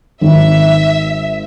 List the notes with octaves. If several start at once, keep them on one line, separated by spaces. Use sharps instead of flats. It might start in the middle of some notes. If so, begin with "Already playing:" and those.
G#1 E5